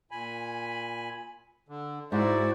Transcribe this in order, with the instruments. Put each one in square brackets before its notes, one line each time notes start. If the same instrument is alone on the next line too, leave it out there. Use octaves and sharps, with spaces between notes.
[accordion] A#2 G#5 B5
D3
[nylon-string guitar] G#2 [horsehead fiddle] E4 [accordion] F#4 C5 D5